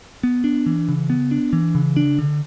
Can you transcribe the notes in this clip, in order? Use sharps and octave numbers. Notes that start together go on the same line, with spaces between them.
B3
D4
E3
C#3
B3
D4
E3
C#3
D4
D3